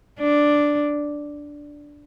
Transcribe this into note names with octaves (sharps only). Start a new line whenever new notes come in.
D4